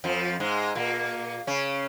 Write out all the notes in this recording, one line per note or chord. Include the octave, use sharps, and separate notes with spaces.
F2 F3
G#2 G#3
A#2 A#3
C#3 C#4